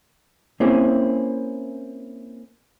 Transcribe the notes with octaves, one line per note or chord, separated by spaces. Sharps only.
A#3 C4 C#4 E4 G#4